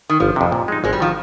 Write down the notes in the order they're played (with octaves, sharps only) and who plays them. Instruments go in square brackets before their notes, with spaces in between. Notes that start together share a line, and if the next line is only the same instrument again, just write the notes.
[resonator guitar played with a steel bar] D#3
[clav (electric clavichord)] G1 [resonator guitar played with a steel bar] F3
[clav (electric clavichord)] F2 C3
A#2
G#3 D#4
[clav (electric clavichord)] G#1 [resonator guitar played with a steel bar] G#3
[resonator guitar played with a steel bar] G3
[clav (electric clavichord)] D#3 [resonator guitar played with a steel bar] F3